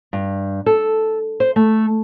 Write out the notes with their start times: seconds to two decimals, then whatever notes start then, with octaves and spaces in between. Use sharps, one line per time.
0.13 G2
0.66 A4
1.40 C5
1.56 A3